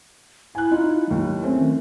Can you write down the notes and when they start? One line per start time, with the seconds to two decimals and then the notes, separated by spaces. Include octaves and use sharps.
0.55 E4 G#5 F#6
0.71 D#4 F4
1.11 D#2 F#3
1.43 A3 C4 C#4
1.59 D#3